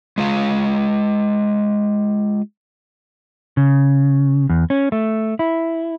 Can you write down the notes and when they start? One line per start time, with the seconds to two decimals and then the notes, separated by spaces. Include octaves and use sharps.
0.18 G#3 F4 F5
3.57 C#3
4.50 E2
4.70 C#4
4.92 A3
5.39 E4